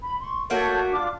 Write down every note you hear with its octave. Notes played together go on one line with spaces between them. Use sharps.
B5
C6 C#6
A3 A#3 F#4 A4 C#5 G6
D4 F4 D6